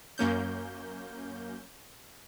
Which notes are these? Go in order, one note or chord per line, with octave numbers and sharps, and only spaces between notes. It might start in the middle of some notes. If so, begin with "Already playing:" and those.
F#2 A#3 C#4 G6